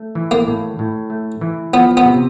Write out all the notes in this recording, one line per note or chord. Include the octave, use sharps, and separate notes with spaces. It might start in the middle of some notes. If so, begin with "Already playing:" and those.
Already playing: A3
E3
A#3
A2
A2
A3
E3
F3 B3
B3
C3